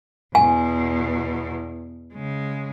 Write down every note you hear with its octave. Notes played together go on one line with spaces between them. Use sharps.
E2 B2 G#5
C#3 G#3